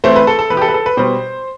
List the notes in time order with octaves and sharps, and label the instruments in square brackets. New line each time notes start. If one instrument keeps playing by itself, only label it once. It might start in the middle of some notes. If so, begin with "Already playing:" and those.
[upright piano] E3 A3 C4 C5
B4
A4
A4
E3 B3 B4
G4
A4
B4
A4
B4
B2 G3 B3 C5